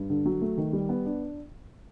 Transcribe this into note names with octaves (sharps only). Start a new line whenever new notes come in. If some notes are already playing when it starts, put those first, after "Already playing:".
Already playing: G2
D3
F#3
A3
D#3
G3
B3
D4